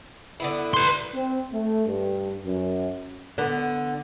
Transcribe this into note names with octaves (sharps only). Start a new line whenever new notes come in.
D3 B3 E4
B4 C6
C4
A3
G2
F#2
D3 B3